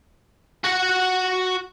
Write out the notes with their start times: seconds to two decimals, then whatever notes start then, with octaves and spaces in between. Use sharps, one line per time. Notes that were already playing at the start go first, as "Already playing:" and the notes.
0.64 F#4 F#5